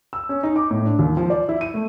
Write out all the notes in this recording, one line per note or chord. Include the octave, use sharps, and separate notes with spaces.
E6
C#4
D#4
D6
A2
D4
D#2
F3
D5
E4
D#7
A3